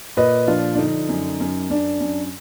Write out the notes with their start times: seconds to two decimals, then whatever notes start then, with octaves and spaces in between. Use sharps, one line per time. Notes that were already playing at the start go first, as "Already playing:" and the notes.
0.17 A#2 B4 D#5
0.47 F3 D4 F4
0.75 D4
0.78 D3 D#4
1.09 F#2
1.40 F#2
1.70 F#2 D4
2.00 F#2